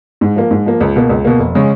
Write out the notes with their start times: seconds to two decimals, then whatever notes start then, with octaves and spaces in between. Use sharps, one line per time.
0.21 G#2
0.36 F3 A#3
0.51 G#2
0.66 F3 A#3
0.81 C#2
0.96 B2 A#3
1.10 C#2
1.25 B2 A#3
1.40 F1
1.55 C#3 G#3 C#4